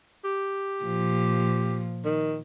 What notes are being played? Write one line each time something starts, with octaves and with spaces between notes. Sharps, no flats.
G4
A#2 F3
D#3